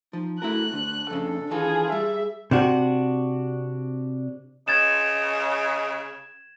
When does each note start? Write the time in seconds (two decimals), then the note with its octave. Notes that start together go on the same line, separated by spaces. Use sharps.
0.13 F3 D#4
0.42 A3 E4 F#4 A#4 F#6
0.73 D2 D4
1.10 F2 C#3 A4
1.51 D#3 E3 F4 G#4 A4
1.92 G3 G#4 E5
2.51 C3 D4 F#4
4.68 C#3 D#5 G#6 A6 E7